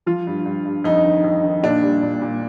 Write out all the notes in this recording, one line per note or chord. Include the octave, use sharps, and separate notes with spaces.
F3 F4
G2
G2
G2
F2 D#4
D#3
F2
D#3
A#2 D4
G3
A#2
A#2